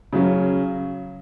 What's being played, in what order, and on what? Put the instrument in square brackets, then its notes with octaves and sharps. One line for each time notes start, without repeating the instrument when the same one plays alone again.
[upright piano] C#3 F#3 C#4